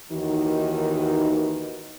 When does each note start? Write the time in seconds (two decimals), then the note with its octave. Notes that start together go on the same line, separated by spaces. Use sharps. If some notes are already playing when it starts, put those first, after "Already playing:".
0.12 D#2 D#3 E3 D#4 F#4